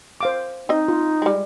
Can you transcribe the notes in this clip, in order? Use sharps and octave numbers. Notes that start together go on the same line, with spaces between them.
C5 F5 D6
C4 D#4 D#5
F4
G3 G#3